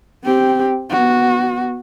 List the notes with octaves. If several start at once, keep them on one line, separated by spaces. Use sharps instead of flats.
C4 G4
B3 F#4